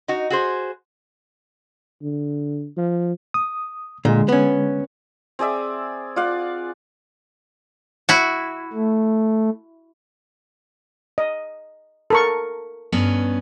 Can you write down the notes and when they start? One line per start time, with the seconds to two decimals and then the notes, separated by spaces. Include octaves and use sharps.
0.08 D#4 F#4
0.30 F#4 G#4 C5
2.03 D3
2.77 F3
3.34 D#6
4.05 A#2 D3 G#3
4.29 B3 C#4
5.39 C4 G#4 D5 E5
6.16 F4 D5 F5 F#5
8.09 E4 F#4
8.73 A3
11.18 D#5
12.10 A4 A#4 C#6
12.92 G2 B3 C#4